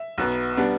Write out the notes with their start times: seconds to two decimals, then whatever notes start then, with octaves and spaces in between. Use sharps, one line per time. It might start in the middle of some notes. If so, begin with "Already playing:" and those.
Already playing: E5
0.18 B1 B2 B3
0.57 G3 B3 D4